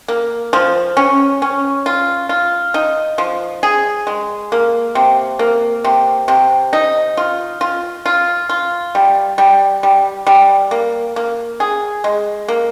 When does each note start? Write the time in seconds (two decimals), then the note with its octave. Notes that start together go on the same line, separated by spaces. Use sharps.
0.08 A#3
0.53 F3
0.97 C#4
1.42 C#4
1.86 F4
2.29 F4
2.74 D#4
3.18 F3
3.63 G#4
4.07 G#3
4.52 A#3
4.95 C3
5.39 A#3
5.84 C3
6.28 C3
6.73 D#4
7.17 F4
7.61 F4
8.06 F4
8.49 F4
8.95 G3
9.38 G3
9.83 G3
10.27 G3
10.71 A#3
11.16 A#3
11.60 G#4
12.04 G#3
12.48 A#3